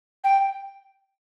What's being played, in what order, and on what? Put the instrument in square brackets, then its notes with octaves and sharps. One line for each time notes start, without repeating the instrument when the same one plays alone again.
[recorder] G5